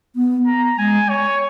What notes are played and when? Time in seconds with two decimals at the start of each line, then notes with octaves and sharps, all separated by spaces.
0.16 B3
0.46 A#5
0.78 G#3 G#5
1.09 C#5